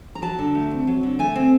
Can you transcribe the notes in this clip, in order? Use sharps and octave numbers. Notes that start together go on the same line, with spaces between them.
A#5
F#3 A5
D3
A3
C4
F#3
D3
A3 G#5
C4